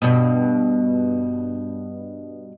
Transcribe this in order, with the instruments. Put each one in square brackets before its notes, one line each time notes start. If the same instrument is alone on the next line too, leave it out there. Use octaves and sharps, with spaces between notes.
[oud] G2 B2